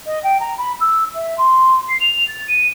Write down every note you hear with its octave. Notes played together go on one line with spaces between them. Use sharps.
D#5
G5
A#5
B5
E6
E5
C6
C7
F7
A6
D#7